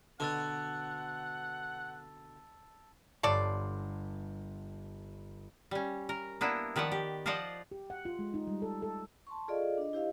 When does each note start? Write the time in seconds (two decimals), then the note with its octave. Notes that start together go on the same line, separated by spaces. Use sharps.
0.20 B2 D3 F#5 A5 E6 A6
3.23 G1 G2 A4 C#5 D5 C6
5.71 G3 C#4
6.09 A#4
6.41 A#3 B3 D4 E4
6.76 D#3 F3 B4 D5 F#5
6.92 G4
7.26 F3 F4 C5 D5 D#5 F#5
7.71 G4
7.90 F#5
8.05 F4
8.19 G#3
8.34 D#4
8.47 G3
8.62 A4
8.82 A4
9.27 A5 C6 C#6
9.48 F4 G#4 A4 D5 D#5 F5
9.78 D4 D#5
9.93 E4 G4 C5 D#5 F5